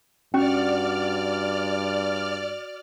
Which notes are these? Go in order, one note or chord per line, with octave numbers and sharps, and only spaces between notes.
G2 C#4 F#4 D5 F6